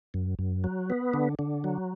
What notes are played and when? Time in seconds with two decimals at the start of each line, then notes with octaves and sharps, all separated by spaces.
0.14 F#2
0.39 F#2
0.64 F#3
0.90 B3
1.14 D3
1.39 D3
1.64 F#3